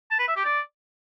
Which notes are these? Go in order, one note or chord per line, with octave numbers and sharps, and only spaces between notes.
A5
B4
E5
G4
D5